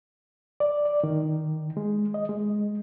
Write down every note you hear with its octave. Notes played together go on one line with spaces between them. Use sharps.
D5
D5
D#3
G#3
D#5
G#3